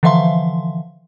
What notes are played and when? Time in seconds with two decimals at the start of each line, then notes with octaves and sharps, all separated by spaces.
0.03 D3 E3 F3 E5 F5 C6